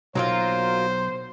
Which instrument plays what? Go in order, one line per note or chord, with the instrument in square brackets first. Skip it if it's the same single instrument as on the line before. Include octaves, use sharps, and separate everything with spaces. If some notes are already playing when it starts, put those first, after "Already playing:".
[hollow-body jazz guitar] B1 [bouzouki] F#3 A#3 F4 [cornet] C5